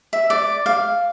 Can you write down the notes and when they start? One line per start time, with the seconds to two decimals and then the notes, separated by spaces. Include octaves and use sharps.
0.13 E5
0.30 D5
0.66 F5